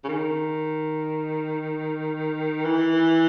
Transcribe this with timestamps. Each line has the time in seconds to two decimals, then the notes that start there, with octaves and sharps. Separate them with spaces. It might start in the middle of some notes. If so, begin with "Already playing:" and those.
0.04 C#3
0.08 D#3
2.65 E3